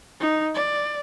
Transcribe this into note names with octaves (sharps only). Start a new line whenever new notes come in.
D#4
D5